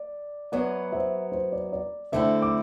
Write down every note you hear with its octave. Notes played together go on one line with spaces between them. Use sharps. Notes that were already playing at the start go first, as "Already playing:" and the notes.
Already playing: D5
F#2 F#3 B3 D5 F#5
C5 E5
C5
D5
D5
D3 A3 C4 E4 C5 E5
D6